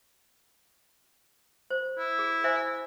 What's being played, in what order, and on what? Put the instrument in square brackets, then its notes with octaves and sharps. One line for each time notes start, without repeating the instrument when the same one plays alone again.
[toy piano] C5
[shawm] E4
[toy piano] G#4
C5 E5 G#5